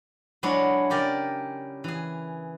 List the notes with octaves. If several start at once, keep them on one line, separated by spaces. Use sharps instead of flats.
F#3 G#3 D4 E4 C#5
C#3 G4 A#4 D5
E3 G#4